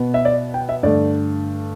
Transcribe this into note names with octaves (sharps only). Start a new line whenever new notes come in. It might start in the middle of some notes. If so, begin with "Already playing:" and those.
Already playing: B2 B3
E5
D5
G5
E5
G2 D3 A3 D5